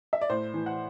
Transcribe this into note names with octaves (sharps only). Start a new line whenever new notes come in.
E5
D5
A2 C5
E3
F#5